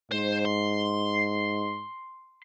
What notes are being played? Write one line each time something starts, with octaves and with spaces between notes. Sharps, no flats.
G#2 C5
C6